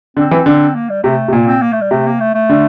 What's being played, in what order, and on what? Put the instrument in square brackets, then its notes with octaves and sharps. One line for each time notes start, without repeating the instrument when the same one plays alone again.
[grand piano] D3 [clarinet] C4
[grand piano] E3
D3
[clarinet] A#3
G3
[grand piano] C3 [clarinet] A3
[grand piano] C3
[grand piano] A#2 [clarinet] A#3
[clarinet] C4
A#3
A3
G3
[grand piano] C3 [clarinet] A3
[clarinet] A#3
A3
A3
[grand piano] D3